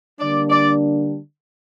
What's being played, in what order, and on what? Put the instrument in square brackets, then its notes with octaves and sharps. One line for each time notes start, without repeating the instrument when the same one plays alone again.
[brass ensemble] D3 G3 A#3 D4 [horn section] D5
[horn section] D5